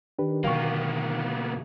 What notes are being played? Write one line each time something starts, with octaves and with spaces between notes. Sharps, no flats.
D#3 D4 G4 B4
B2 D3 F#3 A#3 B3 F5 G5 C#6